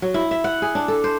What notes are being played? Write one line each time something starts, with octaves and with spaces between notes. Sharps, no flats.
F#3
E4
E5
F#5
G#4
D4
A4
C5